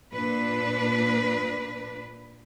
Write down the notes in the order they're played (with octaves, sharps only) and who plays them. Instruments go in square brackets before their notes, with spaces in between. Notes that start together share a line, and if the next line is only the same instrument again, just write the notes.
[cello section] A#2 D4 B4